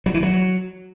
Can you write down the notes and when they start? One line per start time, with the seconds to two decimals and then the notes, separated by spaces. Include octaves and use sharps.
0.06 F#3
0.14 E3
0.23 F#3